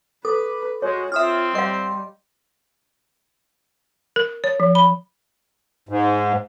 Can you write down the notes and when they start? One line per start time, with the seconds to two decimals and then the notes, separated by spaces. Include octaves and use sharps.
0.25 A4 B4 D6
0.82 G#3 F#4 C#5
1.12 C4 F4 E5 D#6 F6
1.55 G3 D#5 F5 C6
4.16 A#4
4.44 C#5
4.60 F3
4.75 B5
5.89 G#2